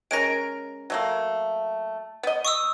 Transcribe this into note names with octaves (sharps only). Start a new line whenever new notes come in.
G#3 C#4 A#4 A#6 D7
F#3 A3 A#3
B3 D#5
C#6 D#6 E6